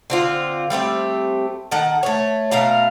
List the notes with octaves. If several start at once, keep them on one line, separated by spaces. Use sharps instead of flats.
D3 C4 F4
G3 A3 C4 G4
D#3 A4 F#5
A3 C#5
B2 A3 F5 A#5